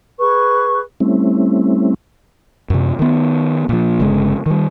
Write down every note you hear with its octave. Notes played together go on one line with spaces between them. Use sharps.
G#4 B4 C#6
G3 A3 C4 C#4 E4
F#2 C3
D#3 B3
A#2 F3
G1 C#3 G#3
D#3 G3